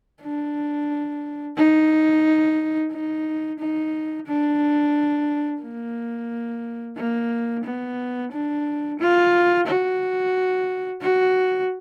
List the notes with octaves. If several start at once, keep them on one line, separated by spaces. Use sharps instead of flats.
D4
D#4
D#4
D#4
D4
A#3
A#3
B3
D4
F4
F#4
F#4